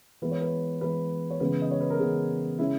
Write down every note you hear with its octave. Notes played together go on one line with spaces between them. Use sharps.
E3 G#3 B3 B4
C#5
B4
E3 G#3 B3 B4
C#5
C#3 E3 G#3 B3 B4
D#5
C#5
B4
A#4
C#3 E3 G#3 B3 G#4
C#3 G#3 C#4 E4